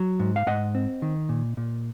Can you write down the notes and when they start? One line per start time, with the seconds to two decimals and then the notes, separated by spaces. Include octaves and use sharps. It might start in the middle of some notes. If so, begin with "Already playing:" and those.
Already playing: F#3
0.20 G#2
0.36 F5
0.47 G#2 D#5 F#5
0.75 C4
1.02 D#3
1.29 A#2
1.57 A#2